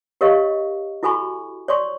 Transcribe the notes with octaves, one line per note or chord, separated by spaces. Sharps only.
G4 A#4 C#5 D#5 F5 C#6
E4 F#4 A4 G#5 B5 C#6
C#5 D5 C6 C#6